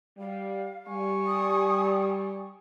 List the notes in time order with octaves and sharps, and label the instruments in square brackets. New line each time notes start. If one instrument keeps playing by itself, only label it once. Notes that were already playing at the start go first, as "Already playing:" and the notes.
[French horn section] G3 [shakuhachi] F5
[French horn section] G3 [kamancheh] G#5 C#6
[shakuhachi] D#6